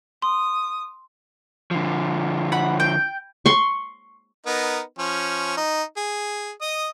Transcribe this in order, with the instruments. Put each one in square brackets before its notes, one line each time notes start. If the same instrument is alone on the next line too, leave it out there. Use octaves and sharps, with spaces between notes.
[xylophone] C6 [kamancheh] D#6
[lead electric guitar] D3 F3
[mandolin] F#5 B5
G5
[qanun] C6 C#6
[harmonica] B3 D#4 A#4
F3 C#4
D#4
G#4
D#5 D#6